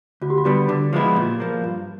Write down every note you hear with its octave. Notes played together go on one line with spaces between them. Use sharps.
D2 F#4
G4
F#4
D3 G3 B3
D3
F3 G#3 B3 E4
A#2
F3 A#3
G2